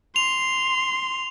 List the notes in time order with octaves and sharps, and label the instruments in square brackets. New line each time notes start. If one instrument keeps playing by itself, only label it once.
[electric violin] C6 [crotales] F7